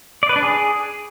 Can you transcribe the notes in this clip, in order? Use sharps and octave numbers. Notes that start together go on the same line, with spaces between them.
D5
B4
D4
G#4